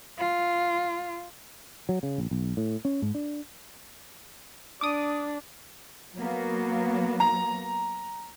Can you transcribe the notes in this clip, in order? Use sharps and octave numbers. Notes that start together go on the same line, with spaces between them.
F4
F#3
C#3
A#1
B1
A2
C#4
G#2
D4
D4 D6 D#6
F#3 A#3 B3
A#5